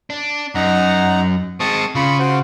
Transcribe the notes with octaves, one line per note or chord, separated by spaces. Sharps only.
D4
F#2 D#4 F#5 A#5
G#3 C4 A5 C#6 D#6
C#3 F4 B5 C#6
F#4 C5